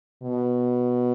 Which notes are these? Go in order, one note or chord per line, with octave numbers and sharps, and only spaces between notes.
B2